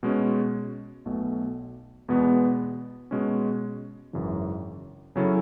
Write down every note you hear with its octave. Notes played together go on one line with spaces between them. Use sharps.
B2 G#3 C#4 F#4
B1 B2 A3
E2 B2 G#3 B3
B2 G#3 C#4
G#1 F#2 C#3 E3
C#3 F#3 C#4 E4 A4